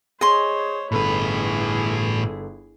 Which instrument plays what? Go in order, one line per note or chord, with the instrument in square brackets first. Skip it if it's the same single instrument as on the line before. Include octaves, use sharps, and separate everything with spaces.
[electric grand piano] G#4 [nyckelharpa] C5 C#5 [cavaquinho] D#5 C6
[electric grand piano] G1 A4 B5 [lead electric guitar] A2 B4 [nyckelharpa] E4 G#4